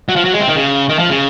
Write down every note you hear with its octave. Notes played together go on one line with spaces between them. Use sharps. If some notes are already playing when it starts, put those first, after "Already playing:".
F#3
F3
F#3
G#3
C4
D#3
C#3
D#3
F3
C#3